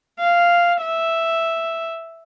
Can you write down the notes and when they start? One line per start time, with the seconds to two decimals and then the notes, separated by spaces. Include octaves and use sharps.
0.19 F5
0.81 E5